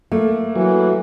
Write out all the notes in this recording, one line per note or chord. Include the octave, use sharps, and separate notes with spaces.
A3 A#3
E3 F#3